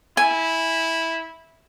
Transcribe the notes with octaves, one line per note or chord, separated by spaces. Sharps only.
E4 G#5